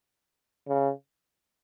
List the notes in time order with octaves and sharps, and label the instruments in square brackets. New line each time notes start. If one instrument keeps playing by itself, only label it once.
[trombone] C#3